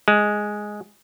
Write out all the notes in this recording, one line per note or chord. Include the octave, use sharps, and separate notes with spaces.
G#3